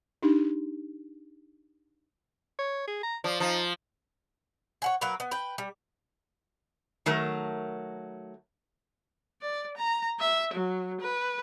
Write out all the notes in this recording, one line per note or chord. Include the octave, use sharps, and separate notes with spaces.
D4 D#4 G4
C#5
G#4
A#5
F3 D5
F3 D#4
C#5 F#5 G#5
F#3 A#3 A#4 B4
B3
B4 G5
G3
D#3 F#3 A3 A#4
D5
A#5
E5
F#3
B4